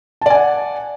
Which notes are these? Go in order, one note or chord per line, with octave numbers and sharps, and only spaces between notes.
D5 F#5 G#5 A5